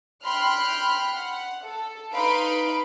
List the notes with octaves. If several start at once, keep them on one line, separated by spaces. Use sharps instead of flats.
G5 B5 C6 F6 F#6
F#5
A4
D#4 B4 F5 B5 C6 D7